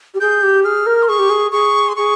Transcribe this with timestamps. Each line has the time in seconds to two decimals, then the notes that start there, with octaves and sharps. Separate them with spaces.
0.14 G4
0.20 G#4 G6
0.42 G4
0.64 G#4 F6
0.86 A#4
1.03 C6
1.08 G#4 C#6
1.19 G4
1.29 G#4
1.52 G#4 C#6
1.89 C6
1.96 G#4 C#6